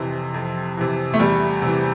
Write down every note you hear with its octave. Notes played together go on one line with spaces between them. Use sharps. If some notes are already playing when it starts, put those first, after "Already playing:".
Already playing: F2 C3 E3
F2
C3 E3
A3
E2 G3
C3 E3